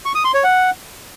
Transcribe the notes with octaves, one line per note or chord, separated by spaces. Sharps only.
C#6
D#6
C6
C#5
F#5